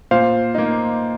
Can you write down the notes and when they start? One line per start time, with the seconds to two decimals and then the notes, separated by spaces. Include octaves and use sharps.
0.11 A#2 C5 F5
0.54 A#3 D#4